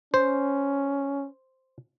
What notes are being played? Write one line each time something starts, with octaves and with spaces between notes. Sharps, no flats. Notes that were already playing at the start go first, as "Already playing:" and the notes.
C#4 C5